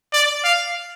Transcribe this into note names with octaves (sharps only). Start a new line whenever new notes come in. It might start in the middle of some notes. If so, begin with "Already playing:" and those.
D5
F5